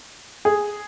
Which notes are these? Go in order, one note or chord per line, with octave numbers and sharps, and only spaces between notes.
G#4